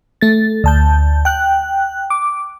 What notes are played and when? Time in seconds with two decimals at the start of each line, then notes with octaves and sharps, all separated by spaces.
0.21 A3 A6
0.64 D2 A5 G6
1.25 G5 F#6
2.10 D6